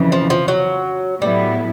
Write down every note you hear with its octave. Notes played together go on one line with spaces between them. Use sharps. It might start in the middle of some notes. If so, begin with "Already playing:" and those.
Already playing: F2 C#3 E3
F3
F3
F#3
A2 F#3 G3 B3 E4